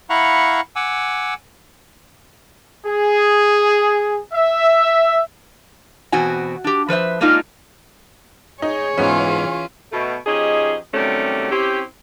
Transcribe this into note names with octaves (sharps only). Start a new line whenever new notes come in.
E4 F5 F#5 A#5 B5 C#6
F#5 G#5 D6 E6
G#4
E5
E2 B2 C4 F#4 G#5
D4 G4
F3 B4 C5 E5
G#3 A#3 D4 D#4 F4
D#4 G#4 C#5
G#2 E3 B3 C#4 E4 F4
B2 A3
F3 C#4 D#4 G4 G#4 D#5
C3 D#3 F#3 G3 A3 C#4
C4 C#4 E4 G4